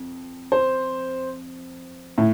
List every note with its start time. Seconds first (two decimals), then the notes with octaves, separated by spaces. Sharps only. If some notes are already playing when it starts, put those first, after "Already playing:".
Already playing: F2
0.52 C5
2.18 A2